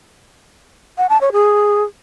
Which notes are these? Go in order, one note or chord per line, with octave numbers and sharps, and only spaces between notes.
F#5
A5
C#5
G#4